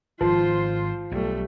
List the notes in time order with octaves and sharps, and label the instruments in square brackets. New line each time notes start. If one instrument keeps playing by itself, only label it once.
[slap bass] G#1 [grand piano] F3 [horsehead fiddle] F4 C5
[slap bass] B1 [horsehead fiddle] G3 A3